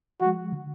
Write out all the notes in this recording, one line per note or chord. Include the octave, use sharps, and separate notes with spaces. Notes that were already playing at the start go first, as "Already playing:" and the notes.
F3 G#3 F#4
D3